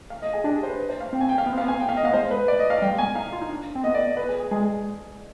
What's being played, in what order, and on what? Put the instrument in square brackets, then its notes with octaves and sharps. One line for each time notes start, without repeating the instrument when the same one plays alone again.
[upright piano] F5
D#5
G#4
[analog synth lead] D4 [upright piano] G4
[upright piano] G#4
C5
B4
C5
F5
[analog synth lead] C4 [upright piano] G5
[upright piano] G#5
G5
F5
[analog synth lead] B3
C4
[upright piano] F5
[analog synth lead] B3
[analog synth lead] C4 [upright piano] G#5
[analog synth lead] B3
[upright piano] G5
F5
D#5
[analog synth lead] B3 [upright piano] F5
[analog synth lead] G#3 [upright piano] C5
[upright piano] B4
D5
D#5
F5
[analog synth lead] G3 [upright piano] G5
[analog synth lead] G#3
[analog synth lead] B3 [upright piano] G#5
[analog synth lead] D#4 [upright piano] F5
[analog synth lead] F4
D#4
D4
C4
[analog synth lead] B3 [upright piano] D#5
[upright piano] D5
D5
B4
G#4
G#4
[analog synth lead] G#3 [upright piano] G#4
[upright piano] G#4